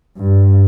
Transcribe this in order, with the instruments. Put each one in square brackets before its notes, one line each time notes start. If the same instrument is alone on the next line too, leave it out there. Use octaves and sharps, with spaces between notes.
[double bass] G2